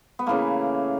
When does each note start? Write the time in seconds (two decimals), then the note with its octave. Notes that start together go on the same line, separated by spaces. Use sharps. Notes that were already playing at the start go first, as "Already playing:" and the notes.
0.19 B3
0.26 C#3 E3 A3 A#3